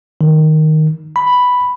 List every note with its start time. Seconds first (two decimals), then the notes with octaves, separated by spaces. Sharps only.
0.21 D#3
1.16 B5